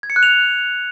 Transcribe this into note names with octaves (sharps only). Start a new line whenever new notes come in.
G#6
C#7
F#6
F7